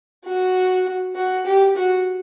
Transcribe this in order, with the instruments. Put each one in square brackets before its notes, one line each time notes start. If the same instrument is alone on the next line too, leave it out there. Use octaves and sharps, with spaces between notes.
[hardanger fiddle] F#4
F#4
G4
F#4